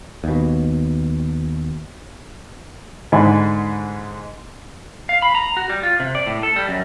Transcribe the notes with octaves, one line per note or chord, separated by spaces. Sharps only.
D#2 B2
G#2 D3 D#4 G#5 B5
F5
B5
A#5
F#4
G3
F4
C3
D5
A2
A4
G3
F#2